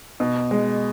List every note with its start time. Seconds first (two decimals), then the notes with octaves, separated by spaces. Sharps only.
0.20 B2
0.51 G#3